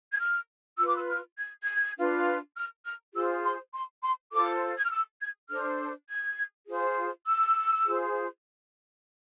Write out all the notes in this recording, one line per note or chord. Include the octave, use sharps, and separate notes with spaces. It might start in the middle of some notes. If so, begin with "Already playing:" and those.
G#6
F6
F4 B4 E6
D6
E6
F6
G#6
G#6
D4 F4 B4
F6
F6
F4 G#4 C5 E6
C6
C6
C6
F4 A4 C5 D6
G#6
F6
E6
G#6
D4 A4 C5 F6
G#6
F4 G#4 C5
E6
F4 G#4 C5